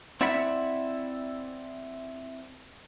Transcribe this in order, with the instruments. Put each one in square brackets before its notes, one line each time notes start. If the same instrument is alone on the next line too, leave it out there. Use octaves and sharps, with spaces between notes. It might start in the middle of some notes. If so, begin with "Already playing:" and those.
[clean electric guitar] C4 E4 D5 E5 F#5 B5